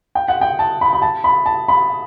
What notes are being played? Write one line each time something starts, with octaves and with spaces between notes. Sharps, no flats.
G5
F#5
G5
A5
B5
B5
A5
B5
A5
B5